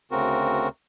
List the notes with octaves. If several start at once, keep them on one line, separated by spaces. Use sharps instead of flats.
D2 C#3 C4 F#4 A#4